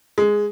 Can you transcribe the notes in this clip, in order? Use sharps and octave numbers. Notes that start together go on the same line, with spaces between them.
G#3